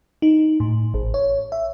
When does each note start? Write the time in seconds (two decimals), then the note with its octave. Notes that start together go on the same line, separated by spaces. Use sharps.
0.22 D#4
0.60 A2
0.94 A1
1.14 C#5
1.52 E5